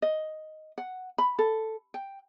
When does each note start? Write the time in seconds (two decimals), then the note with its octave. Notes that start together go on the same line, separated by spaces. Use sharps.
0.02 D#5
0.78 F#5
1.18 B5
1.39 A4
1.94 G5